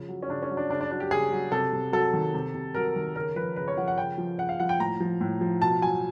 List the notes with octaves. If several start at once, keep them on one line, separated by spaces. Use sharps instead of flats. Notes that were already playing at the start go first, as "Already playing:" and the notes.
Already playing: C#3 F3
F#3
C#4
C#3 D4
C#4
F#3
D4
C#3 D4
D4
F#3 D4
G4
C#3 G#4
F#3
C3 A4
C3
F#3 A4
D#3
C3
C3
F#3 A#4
D#3
C#3 A#4
F3 B4
C#3 B4
C#5
F3 F#5
F#5
C#3 G5
F3
C#3 F#5
F5
F3 F#5
G5
A2 A#5
F3
A2
F3
B2 A5
F#3 G#5